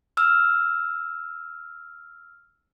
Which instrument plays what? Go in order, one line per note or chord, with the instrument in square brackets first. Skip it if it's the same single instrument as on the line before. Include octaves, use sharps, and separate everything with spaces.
[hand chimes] E6 F6